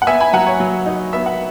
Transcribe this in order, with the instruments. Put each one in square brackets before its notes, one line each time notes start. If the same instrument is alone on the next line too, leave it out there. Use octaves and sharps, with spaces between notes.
[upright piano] F#5
B3 E5 G#5
G#5 B5
F#3 F#5 A#5
C#5
F#3
D#4
B3 E5
F#5